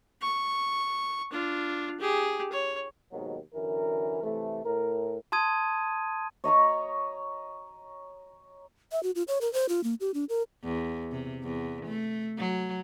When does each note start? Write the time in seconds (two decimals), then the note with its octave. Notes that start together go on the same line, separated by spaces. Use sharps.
0.21 C#6
1.31 D4 F4
2.00 G4 G#4
2.52 C#5
3.12 D#2 G#2 B2 D#3 F#3
3.54 F#2 D3 E3 A#4
4.22 C3 E3 A3
4.65 A2 A#4
5.32 A5 C6 D#6 G#6 D#7
6.44 C#5 D#5 A#5 C#6
8.92 E5
9.03 F#4
9.15 F4
9.28 C#5
9.41 A#4
9.53 C5
9.69 F4
9.84 A#3
10.00 G4
10.14 D4
10.29 A#4
10.63 E2
11.12 C3
11.43 E2
11.86 A3
12.38 F#3